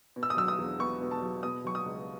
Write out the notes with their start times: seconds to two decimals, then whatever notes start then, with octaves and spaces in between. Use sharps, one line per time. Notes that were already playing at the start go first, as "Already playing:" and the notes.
0.16 B2
0.23 E6
0.30 D#6
0.37 F#3 E6
0.48 D#6
0.58 E2
0.79 B3 C#6
1.01 B2
1.11 A5
1.22 F#3
1.43 B2 D#6
1.64 F#3 C#6
1.75 D#6
1.86 C#2